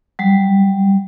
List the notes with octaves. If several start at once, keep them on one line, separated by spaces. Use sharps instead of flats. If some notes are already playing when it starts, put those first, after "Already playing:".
F#3 G3